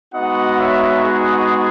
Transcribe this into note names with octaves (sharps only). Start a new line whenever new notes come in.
G#3 B3 D#4 F#4 D#5 F#5
C#5 E5
G#4